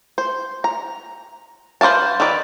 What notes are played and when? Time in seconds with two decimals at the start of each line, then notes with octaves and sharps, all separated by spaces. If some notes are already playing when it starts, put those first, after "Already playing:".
0.18 C5
0.64 A#5
1.81 B4 C5 D5 F5 A5
2.20 D#3 A4 B4 D5